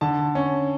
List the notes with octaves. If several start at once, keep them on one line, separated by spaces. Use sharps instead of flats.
D3 A5
C#4